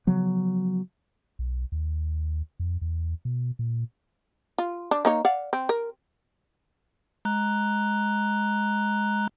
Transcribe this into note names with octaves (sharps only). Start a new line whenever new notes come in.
C#3 F3 F#3 B3
B1
D#2
F2
E2
B2
A#2
F4
D4
A#3 D#4 C#5
D5 F5 F#5
C4
A#4
G#3 A#5 F#6